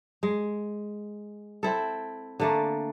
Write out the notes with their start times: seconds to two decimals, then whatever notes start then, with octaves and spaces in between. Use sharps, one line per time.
0.23 G#3
1.63 C4 E4 A4
2.40 D3 A3 A#3